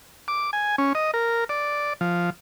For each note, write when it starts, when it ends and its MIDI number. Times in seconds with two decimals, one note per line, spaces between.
0.28 0.51 86
0.53 0.76 80
0.78 0.93 61
0.95 1.11 75
1.14 1.44 70
1.49 1.93 74
2.01 2.30 53